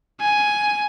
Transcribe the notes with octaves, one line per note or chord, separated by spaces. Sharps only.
G#5